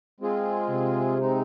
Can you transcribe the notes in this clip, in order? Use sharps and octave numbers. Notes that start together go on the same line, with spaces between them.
G#3 C4 F4 G#4
C3
G#3 C4 D#4